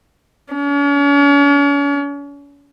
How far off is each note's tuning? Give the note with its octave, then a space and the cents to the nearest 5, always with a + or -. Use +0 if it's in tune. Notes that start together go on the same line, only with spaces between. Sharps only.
C#4 +40